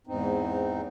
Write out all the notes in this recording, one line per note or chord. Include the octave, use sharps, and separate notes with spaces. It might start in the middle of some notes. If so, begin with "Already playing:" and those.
E2 G#2 C4 D#4